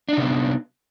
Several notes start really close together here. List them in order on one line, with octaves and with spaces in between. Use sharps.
D4 D#4 C3 B3